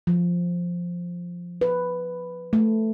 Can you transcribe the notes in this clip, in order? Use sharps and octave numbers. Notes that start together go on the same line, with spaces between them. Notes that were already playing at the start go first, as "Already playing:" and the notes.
F3
B4
A3